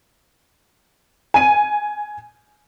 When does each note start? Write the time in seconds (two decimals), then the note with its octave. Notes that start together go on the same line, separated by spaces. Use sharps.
1.34 G#5 D#7